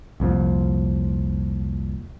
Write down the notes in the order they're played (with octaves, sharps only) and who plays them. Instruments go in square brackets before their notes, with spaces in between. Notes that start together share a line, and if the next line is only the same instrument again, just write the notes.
[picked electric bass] C2 F2 A#2